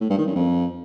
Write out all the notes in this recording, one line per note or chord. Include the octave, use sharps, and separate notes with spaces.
A2
G2
D#3
F#2
F2